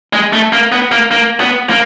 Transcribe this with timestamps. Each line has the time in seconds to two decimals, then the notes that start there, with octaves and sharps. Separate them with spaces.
0.13 G#3
0.33 A3
0.52 A#3
0.72 B3
0.91 A#3
1.11 A#3
1.40 B3
1.70 A#3